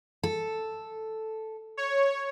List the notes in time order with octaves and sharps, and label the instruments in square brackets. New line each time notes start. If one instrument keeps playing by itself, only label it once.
[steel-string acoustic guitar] A4
[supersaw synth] C#5